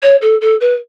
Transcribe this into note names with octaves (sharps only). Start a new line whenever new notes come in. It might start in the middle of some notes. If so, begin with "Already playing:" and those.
C#5
A4
A4
B4